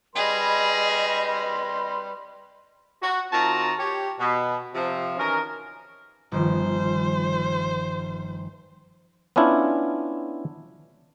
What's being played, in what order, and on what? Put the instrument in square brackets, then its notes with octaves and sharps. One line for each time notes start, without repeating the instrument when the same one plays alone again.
[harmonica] G3 B4 C6 [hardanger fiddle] G#4 [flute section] D#5 B5
[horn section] F#4
D#3 C4 F4 F#4 A5 A#5
G4 C#5
B2
C3 F3
D#3 E3 C#4 F#4 A#4
[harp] G1 D#3 F3 [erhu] C5
[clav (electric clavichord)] B3 C#4 D4 E4 F4